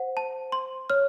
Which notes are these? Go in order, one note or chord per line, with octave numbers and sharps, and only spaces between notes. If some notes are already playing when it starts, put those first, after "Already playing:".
Already playing: C5 F#5
A5
C6
C#5 F6